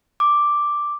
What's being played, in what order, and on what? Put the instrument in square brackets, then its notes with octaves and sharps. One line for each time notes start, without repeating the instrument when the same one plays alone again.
[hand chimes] D6